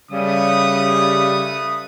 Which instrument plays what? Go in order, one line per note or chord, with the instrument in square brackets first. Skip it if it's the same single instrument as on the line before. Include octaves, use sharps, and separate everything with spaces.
[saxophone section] C#3 G3 [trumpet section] A3 B4 D#6